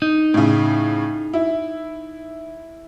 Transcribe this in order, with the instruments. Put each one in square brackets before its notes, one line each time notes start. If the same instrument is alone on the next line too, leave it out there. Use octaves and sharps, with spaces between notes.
[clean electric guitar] D#4
[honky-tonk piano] A2 C#3
E4